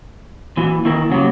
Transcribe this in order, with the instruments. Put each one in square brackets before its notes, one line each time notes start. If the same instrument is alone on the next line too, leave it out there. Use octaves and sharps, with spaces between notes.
[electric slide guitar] A#2 E3 [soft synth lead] F#4
[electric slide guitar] D#3 E4 A#4 [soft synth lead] A#3
[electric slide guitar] C#3 F#3 G3